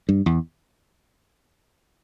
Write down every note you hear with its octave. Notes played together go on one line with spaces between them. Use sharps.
G2
E2